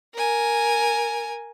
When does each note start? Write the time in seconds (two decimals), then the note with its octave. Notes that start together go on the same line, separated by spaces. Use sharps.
0.15 A#4 G#5